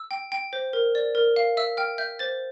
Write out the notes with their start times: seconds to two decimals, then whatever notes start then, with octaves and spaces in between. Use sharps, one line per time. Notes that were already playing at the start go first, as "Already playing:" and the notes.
Already playing: E6
0.11 G5
0.32 G5
0.53 C5
0.73 A#4
0.95 D5
1.15 A#4
1.36 F5
1.57 E5 E6
1.77 G5 F6
1.98 E5 G6
2.19 C5 A6